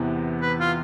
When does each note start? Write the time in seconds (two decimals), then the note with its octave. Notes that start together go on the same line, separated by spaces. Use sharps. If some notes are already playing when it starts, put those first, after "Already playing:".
Already playing: E2 C3 E3 B3
0.41 B4
0.60 F4